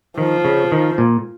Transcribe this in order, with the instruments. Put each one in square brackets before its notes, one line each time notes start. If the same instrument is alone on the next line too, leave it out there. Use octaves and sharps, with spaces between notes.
[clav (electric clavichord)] D#3 [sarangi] F3
[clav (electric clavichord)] C#3
D#3
A#2